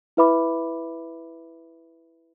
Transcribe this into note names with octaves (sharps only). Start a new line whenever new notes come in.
E4 B4 E5 B5 D6